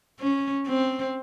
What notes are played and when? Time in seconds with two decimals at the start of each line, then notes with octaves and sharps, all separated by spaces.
0.20 C#4
0.68 C4